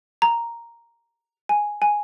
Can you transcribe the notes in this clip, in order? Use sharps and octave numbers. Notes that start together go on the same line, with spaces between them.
A#5
G#5
G#5